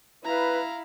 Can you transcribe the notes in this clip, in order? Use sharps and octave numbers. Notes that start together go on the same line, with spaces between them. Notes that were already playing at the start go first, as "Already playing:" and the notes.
E4 B4 F5 A#5